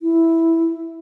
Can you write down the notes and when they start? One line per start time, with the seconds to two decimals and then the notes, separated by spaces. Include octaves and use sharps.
0.01 E4